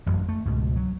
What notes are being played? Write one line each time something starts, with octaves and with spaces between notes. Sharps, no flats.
A1 F#2
A3
C#2 G#2 B2
F#3